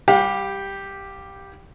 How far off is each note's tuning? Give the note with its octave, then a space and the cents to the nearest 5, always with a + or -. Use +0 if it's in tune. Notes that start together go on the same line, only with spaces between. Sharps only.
G3 +5 G4 +0 F5 +40